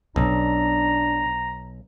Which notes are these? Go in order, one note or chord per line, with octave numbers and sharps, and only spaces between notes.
B1 B2 C#4 D4 A#5